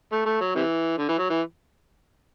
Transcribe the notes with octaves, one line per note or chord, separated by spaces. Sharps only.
A3
A3
F#3
C3 E3
D3
E3
F#3
E3